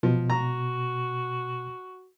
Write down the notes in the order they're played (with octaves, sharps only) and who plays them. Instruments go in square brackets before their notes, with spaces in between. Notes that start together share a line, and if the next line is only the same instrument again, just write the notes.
[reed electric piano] B2 [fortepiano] F3
[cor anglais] F#4 [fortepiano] A#5